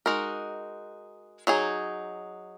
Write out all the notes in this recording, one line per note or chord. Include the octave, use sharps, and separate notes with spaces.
G#3 D#4 F#4 A#4
F#3 D#4 G#4